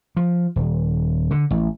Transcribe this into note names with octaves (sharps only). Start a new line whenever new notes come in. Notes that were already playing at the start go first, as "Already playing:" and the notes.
F3
D#1
D3
A1